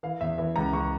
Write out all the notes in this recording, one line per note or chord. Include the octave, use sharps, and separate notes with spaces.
E3 F5
E2 E5
E3 E5
C#2 A#5
C#2 C#6